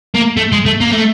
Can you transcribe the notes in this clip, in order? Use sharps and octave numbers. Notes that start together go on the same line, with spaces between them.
A#3
A3
G#3
A3
A#3
A3